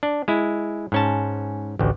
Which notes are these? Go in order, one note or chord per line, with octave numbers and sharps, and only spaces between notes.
D4
G#3 E4
G#2 C#4 A5
A1 D2